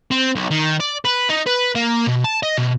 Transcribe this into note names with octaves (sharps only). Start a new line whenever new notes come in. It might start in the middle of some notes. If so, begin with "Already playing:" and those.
C4
B1
D#3
D5
B4
D#4
B4
A#3
B2
A5
D#5
B2